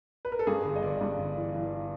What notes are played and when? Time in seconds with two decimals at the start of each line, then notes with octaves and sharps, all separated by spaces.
0.25 B4
0.32 A#4
0.39 A4
0.47 G2 G#4
0.65 G1
0.76 D#5
0.83 G1 D5
1.01 G2
1.18 G1
1.36 E3
1.54 E3